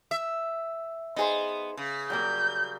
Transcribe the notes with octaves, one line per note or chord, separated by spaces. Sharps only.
E5
B3 D#4 G#4 C5
C#3
F#3 G3 A#3 G6